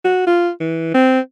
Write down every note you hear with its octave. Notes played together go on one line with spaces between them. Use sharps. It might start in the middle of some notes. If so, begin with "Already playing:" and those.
F#4
F4
E3
C4